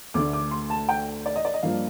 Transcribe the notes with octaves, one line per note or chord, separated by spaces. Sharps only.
D2 D3 A3 D4 D6
D6
C6
A5
G5
D5
D#5
D5
D#5
G2 F3 A#3 D4 F4 F5